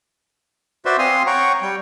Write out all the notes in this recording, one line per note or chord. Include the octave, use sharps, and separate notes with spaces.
F#4 B4 C5 D5 E5 C6
C4 F5 G#5 C6 D#6 F6
C#5 F#5 G5 A#5 C#6
G3 G5